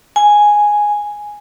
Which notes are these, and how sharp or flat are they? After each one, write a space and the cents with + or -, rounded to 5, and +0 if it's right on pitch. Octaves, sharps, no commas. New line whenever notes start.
G#5 +0